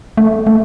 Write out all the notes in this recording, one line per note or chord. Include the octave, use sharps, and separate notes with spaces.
A3
A3